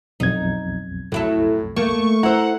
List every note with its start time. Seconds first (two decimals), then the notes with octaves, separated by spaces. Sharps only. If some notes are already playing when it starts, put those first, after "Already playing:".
0.20 B1 F2 D#4 G#6
1.12 A2 F#3 E4 A4
1.76 A3 A#3 C#6
2.23 E4 C5 F#5 A#5 E6